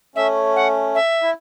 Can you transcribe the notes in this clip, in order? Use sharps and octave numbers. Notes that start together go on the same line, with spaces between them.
A3 C#4 E5
F#5
E5
E4